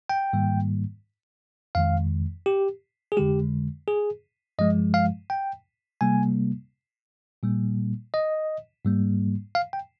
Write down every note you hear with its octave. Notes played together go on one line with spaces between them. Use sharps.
G5
G#2 D#3 G3 A#3
F2 D#3 G#3 F5
G4
G#4
F2 D3 G#3 G4
G#4
G2 F3 G#3 D#5
F5
G5
C3 G3 A#3 G#5
A#2 G3 A#3
D#5
G#2 G3 A#3
F5
G5